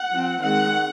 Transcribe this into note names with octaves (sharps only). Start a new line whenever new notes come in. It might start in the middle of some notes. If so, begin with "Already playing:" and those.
Already playing: F#5
F3 C4
D#3 G#3 C4 F#5